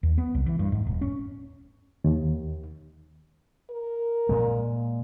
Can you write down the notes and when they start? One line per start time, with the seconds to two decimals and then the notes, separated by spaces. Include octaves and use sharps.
0.03 D#2
0.18 B3
0.35 C2
0.46 E3
0.59 G2
0.72 G#2
0.87 D#1
1.01 C#4
2.04 D#2
3.70 A#4
4.29 A#2 G#3